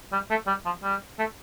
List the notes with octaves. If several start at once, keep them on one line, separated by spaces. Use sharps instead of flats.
G3
A3
G3
F3
G3
A3